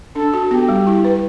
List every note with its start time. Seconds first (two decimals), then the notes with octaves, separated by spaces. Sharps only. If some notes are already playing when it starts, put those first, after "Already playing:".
0.16 D4 A4
0.34 F#4
0.51 B3 G4
0.69 G3
0.87 E4
1.04 B4